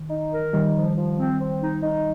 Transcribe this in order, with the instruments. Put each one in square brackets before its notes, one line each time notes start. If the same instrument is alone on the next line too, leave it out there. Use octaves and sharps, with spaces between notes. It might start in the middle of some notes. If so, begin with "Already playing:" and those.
Already playing: [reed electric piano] D#3
[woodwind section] D#4
A#4
[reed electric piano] D#3 G3 [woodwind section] D#4
[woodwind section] F3
F3
C4
C4
D#4
D#4